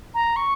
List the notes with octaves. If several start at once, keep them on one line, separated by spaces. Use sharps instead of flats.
A#5
C#6